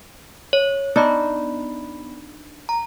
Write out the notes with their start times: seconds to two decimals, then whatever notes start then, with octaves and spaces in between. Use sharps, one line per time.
0.53 C#5
0.96 B3 D4 D#4 B5
2.69 A#5